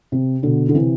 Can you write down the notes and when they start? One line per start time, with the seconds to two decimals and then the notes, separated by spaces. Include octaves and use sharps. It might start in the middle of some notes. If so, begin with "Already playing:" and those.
0.12 C3
0.43 B2 D3
0.69 D3
0.74 C3 E3